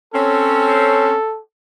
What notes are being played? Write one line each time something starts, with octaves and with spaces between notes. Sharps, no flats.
C4 C#4 A4